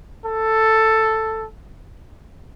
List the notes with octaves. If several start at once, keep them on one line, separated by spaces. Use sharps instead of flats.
A4